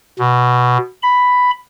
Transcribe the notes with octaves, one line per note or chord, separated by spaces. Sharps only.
B2
B5